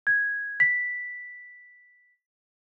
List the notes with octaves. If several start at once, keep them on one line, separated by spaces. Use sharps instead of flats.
G#6
B6